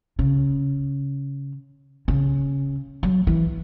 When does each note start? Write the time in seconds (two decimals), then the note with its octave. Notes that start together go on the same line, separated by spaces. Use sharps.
0.19 C#3
2.08 C#3
3.03 F#3
3.27 E3